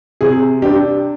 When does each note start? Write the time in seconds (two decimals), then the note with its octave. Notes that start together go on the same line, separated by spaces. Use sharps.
0.21 C3 G#4
0.62 D4 G4